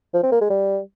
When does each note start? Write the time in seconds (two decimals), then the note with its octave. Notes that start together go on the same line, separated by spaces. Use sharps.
0.14 F3
0.23 C4
0.32 A#3
0.41 G#3
0.50 G3